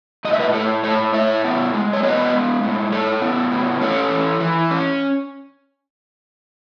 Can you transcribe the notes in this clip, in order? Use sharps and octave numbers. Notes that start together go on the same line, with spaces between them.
A2 D#5
E5
B4 D#5
A2 A4 C#5
A2 A4 C#5
A2 C#5 E5
B3
G#3
C#5
B3 B4 D#5
G#3
A2
A2 A4 C#5
B3
A2
C#4 A4 C#5
E3
E3
C#4